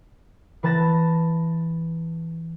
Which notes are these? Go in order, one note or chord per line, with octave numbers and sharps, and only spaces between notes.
E3 B4 A5 A6 A#6